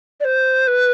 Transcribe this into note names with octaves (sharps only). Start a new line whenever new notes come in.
D5
C5
B4